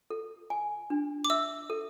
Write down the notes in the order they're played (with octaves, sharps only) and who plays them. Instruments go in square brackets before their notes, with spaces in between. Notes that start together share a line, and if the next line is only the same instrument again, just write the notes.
[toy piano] A4
G#5
D4
[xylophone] D6
[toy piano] E5 [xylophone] E6
[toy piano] A4